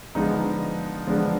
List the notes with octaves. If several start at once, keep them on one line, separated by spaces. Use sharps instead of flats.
D3 F3 G#3 B3 D4 D#4
D3 F3 G#3 B3 D4